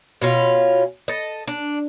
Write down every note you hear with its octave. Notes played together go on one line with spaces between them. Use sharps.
B2 C#4 F4
A4 D#5
D4